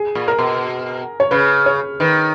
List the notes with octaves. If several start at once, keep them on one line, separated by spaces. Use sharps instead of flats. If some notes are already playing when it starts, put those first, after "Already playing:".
Already playing: G#4
A#2
A#4
B2
C#5
C#3 B4
C#5
D#3 B4